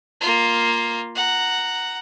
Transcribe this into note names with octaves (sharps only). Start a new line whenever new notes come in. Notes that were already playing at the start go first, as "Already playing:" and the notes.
A#3 F4
F#5 A#5